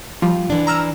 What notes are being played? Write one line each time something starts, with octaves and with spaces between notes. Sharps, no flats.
F3 G3 F4
E3 D4
A#5 E6 F6